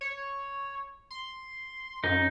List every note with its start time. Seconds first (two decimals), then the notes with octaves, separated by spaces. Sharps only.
0.01 C#5
1.11 C6
2.04 F#2 D#4